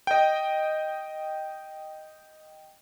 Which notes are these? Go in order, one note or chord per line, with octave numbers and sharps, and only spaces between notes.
D#5 G5